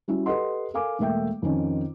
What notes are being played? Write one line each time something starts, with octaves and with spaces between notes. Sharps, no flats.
G3 C#4 E4 F#4
G4 A4 B4 D#5 F#5 C6
A4 A#4 F5 G#5 D6
E1 A3 A#3 E5 G5
F2 D#3 C#4